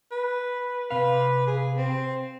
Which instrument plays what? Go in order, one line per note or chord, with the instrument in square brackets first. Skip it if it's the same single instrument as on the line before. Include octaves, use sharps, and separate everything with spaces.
[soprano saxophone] B4
[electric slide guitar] C3 F5 [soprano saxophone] B4
[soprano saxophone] G#4
C4